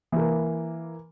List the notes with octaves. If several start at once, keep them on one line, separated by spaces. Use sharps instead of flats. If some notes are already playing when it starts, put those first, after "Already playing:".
E3 A#3